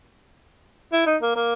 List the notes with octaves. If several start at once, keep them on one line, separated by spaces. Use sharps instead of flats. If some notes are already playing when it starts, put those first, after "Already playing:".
E4
D#4
A#3
A#3